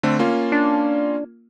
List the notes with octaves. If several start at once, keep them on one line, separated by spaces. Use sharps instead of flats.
D3 A3 C4
A#3 C#4 F4
D4